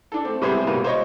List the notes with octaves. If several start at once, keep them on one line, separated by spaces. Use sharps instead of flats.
D4 A4
A3 C4
C3 G3 B3 E4 G#4 C5
G#1 B2 G3 A#3 B4
C5 C#5 D#5 C#6